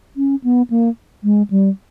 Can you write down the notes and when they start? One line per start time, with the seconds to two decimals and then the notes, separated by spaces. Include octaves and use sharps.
0.17 C#4
0.44 B3
0.70 A#3
1.24 G#3
1.50 G3